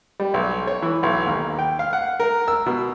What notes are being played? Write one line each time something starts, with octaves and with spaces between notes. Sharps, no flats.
G3
B1
C#5
E3
B1
D#2
G5
F5
F#5
A#4
E6
B2